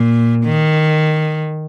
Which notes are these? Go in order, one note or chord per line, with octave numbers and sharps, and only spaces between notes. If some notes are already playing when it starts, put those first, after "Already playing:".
Already playing: A#2
D#3